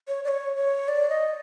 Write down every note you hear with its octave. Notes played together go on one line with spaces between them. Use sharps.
C#5
D5
C#5
C#5
D5
D#5